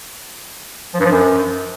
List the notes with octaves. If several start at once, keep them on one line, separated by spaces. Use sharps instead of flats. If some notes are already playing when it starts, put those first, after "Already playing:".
F3
G2
F3
F#2